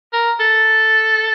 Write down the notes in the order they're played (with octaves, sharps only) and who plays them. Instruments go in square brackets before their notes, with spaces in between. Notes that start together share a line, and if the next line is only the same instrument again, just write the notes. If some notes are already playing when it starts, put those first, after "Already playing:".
[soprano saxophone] A#4
A4